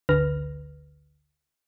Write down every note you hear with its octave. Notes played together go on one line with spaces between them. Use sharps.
G#1 D2 D3 B4 F6 A#6